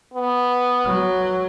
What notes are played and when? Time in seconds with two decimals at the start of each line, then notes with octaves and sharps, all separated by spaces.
0.14 B3
0.86 F#3